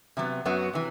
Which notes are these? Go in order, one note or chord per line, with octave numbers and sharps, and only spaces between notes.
C3 F#3 B3
F#2 F#3 B3 F#4
C3 E3